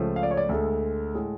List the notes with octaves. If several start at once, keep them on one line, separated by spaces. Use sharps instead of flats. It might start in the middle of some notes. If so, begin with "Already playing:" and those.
Already playing: C#2 C#3 F3 A3
F5
D5
C#5
D5
D2 D3 G#3 A4
A2 G#3